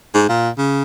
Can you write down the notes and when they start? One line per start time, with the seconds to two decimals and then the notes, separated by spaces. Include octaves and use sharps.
0.15 G#2
0.29 A#2
0.58 C#3